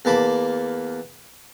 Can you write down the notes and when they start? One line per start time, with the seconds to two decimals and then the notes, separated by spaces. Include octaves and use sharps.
0.05 E2 A#3 A5 B5 D6